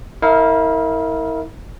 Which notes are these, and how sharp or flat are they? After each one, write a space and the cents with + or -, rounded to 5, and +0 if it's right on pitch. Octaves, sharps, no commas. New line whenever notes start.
E4 -35 A#4 -15 F5 +0